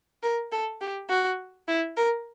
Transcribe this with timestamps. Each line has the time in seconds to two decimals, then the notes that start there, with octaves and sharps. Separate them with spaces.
0.23 A#4
0.52 A4
0.81 G4
1.10 F#4
1.68 E4
1.97 A#4